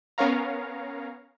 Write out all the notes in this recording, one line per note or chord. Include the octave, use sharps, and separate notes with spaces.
B3 C#4 A#4 C#5 F5 A#5